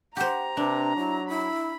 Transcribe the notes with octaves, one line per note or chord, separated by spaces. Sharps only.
G4 C5 F#5 A#5
C3 D4 B4
F#3 E4
E4 B5